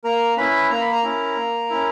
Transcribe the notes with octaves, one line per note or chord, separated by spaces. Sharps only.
A#3 A#4 A#5
C#4 E4 B4 B5
A#3 A#5
B5
A#4 A#5
C#4 E4
A#3
C#4 E4